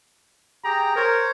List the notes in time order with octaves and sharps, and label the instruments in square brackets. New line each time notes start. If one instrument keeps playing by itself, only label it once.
[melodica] G4 G#4 G5 [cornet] A#5
[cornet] A#4 [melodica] C5 C#5